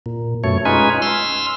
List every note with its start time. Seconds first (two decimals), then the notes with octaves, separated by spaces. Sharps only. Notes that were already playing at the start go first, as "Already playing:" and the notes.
0.06 A#2
0.44 F#2 B2 A3 C#5
0.65 G#3 C#4 D#4 F4 B4 G#5
1.02 C6 E6 F6